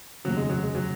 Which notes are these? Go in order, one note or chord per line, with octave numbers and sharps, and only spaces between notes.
F1 D#2 C#3 F#3
G#3
F#3
G#3
F#3